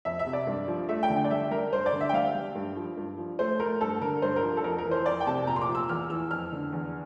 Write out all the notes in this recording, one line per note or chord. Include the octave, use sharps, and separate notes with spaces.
F2 E5
E5
C3
D5
G2
F3
A3 E5
G5
D3
G5
D5
G3 E5
G3 A#4
G2 C5
D5
D3
E5
G5
G3 F5
G3
G2
F3
G2
F3
A3 C5
A3 A#4
G2 A4
D3 A#4
G2 C5
A#4
F3
A4
F2 A#4
A#4
E3
C5
F2 D5
G5
C3 A5
A#2 A#5
C6
D6
F3
E6
E2 F6
E3 E6
F2 F6
D3
E2